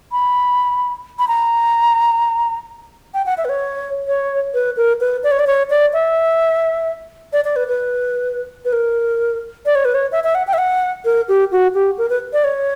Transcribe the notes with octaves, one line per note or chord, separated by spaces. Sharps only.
B5
B5
A#5
G5
F#5
E5
B4
C#5
C#5
B4
A#4
B4
D5
C#5
D5
C#5
D5
E5
D5
D5
B4
B4
B4
A#4
D5
C#5
B4
C#5
E5
E5
F#5
G5
E5
F#5
A#4
G4
F#4
G4
A#4
B4
D5
C#5